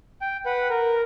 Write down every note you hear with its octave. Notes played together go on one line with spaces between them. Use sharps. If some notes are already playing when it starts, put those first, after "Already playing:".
G5
B4 F#5
A#4